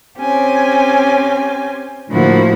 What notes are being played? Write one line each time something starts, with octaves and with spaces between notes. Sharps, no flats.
C4 C#4 G4 G#5
A2 D3 F3 A#3 E4 F#4